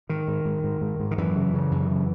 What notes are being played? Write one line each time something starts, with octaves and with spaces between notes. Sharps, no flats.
G#2 D#3
G#2
G#2
G#2
G#2
G#2
D#3
F#2 E3
C#3
C#3
F#2
C#3